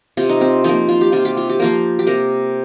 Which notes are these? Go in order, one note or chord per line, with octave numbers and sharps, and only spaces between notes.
C3 F4
D#4
C4
F3 A#3 D#4
F4
G4
C3 F4
G4
F4
G4
F3 A#3 F4
G4
C3 A#4